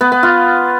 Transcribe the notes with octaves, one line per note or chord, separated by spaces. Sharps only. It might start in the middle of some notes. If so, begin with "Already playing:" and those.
B3
B3
F4